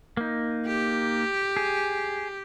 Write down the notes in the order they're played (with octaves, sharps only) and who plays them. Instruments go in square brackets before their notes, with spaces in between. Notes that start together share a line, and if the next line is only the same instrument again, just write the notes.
[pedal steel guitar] A#3 D#4
[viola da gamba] G4
[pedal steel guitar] G#4